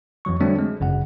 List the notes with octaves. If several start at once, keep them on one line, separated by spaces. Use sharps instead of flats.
F2 E3 F#3 C#6
D3 F#3 G3 A3 C4 D4
G#3
G1 F#2 C#3 F#5